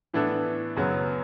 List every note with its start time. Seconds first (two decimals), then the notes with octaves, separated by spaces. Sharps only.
0.14 A2 E3 B3 D4 A4
0.76 F#2 C#3 F#3 B3